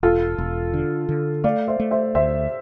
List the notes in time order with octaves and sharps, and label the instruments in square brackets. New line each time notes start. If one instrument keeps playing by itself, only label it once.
[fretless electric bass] E1 [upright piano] F4 A4
[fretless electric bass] E1
D3
D3
[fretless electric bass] A3 [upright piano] D5 F5
[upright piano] C5 E5
[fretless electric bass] A3
[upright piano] C5 E5
[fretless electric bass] D2 [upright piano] C5 E5